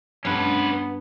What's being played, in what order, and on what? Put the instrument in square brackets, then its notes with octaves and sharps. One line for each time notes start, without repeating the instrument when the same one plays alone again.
[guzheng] G2 [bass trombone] B3 [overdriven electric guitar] C#4 B4